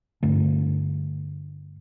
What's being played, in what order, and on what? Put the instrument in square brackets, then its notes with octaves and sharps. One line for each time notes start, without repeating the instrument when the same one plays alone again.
[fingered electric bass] G2 D3 A3